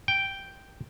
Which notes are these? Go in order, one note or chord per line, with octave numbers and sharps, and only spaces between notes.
G5